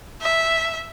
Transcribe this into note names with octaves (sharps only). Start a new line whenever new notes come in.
E5